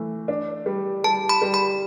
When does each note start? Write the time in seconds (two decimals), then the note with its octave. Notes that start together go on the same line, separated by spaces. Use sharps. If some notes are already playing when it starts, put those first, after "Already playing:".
Already playing: E3 A3
0.28 D4
0.66 G3
1.04 G3 A5
1.29 B5
1.42 G3
1.54 B5